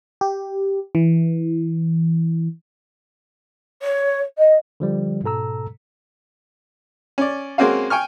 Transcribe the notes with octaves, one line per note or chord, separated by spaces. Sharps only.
G4
E3
C#5
D#5
D3 F3 G3
G#2 B2 A4 A#5 E6
C#4 D5
G#3 A#3 C4 C#4 F#4 F5
G5 G#5 C#6 F6